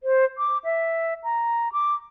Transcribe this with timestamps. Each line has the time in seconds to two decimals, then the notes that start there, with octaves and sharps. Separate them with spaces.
0.03 C5
0.38 D6
0.64 E5
1.24 A#5
1.72 D6